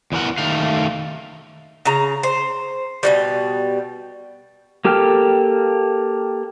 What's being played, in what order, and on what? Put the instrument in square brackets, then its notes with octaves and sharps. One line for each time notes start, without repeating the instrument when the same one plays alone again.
[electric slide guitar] E2 E3 A#4 F#5
D#3 A3 F5
[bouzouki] C#3 A#5
C5
B2 E3 G3
[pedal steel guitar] A#3 G4 A4 G5 F6